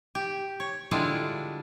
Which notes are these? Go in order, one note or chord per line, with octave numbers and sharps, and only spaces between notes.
G4
C#5
D3 G3 G#3 D4 E4 F4